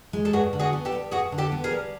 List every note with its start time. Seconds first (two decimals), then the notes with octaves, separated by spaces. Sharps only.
0.13 G#3
0.25 A4
0.33 G2 F#4 G#4
0.53 D3
0.60 F#4 G#4
0.73 B3
0.85 G4 A4
0.92 G3
1.12 G2 F#4 G#4
1.32 D3
1.38 G4 A4
1.52 B3
1.64 G#4 A#4
1.71 G3